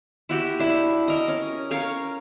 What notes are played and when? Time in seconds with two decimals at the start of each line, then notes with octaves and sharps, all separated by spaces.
0.29 E4 F#4 G4
0.59 D4 E4
1.08 A#4 D#5
1.28 C#4
1.71 C#4 A#4 C#5 F5